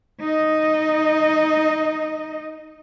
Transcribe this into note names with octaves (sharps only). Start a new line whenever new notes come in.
D#4 D#5